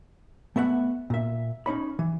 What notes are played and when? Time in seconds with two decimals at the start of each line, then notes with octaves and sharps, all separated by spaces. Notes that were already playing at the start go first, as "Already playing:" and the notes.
0.56 A3 B3 E5 F#5
1.10 A#2 E5
1.66 C#4 D#4 C#5 B5
1.99 E3